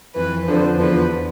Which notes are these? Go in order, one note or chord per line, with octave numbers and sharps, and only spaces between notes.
F2 E3 B4
F2 D3 F3 C5
E2 D3 F3 B4